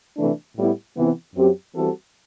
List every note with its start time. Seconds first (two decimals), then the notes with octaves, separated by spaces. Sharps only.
0.17 C3 E3 A3 D4
0.56 A2 G3 B3 E4
0.96 C3 E3 B3
1.36 F#2 F#3 C4 G4
1.75 E3 G3 C4 F#4 A4